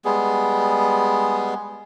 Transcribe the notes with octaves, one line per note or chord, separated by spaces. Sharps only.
G3 G#3 B3 G#4